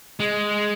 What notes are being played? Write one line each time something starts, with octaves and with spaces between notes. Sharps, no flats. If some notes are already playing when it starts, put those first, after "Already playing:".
G#3